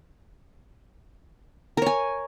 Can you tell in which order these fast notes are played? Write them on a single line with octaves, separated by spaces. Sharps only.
A#4 C#5 G#5